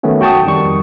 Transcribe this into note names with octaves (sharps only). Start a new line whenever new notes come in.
D#3 F#3 A3 B3 C#4
F#4 G5 A5 C#6 D#6
F2 D#3 G3 C#6